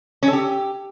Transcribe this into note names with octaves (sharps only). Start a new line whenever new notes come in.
C#4
A4
G4